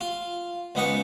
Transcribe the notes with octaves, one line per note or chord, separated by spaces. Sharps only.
F4
C#2 B3 D#4 C#6